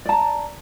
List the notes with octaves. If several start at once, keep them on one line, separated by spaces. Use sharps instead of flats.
D5 A5 A#5